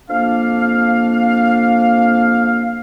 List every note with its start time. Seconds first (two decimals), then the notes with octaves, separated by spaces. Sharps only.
0.10 F2 A#3 D4 F5